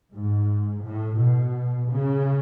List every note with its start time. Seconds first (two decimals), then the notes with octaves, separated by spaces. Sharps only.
0.14 G#2
0.85 A2
1.20 B2
1.91 C#3